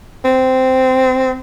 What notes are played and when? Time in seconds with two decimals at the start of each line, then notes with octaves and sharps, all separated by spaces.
0.25 C4